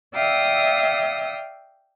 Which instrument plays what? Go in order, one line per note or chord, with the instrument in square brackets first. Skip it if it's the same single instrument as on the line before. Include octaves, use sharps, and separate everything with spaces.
[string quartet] D5 E5 F5 G5 D#6 E6